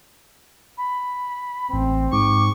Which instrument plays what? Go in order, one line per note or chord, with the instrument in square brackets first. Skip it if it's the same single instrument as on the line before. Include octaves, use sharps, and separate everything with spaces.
[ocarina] B5
[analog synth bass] A1 [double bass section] C4
[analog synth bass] G#2 [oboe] C#6 [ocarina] D6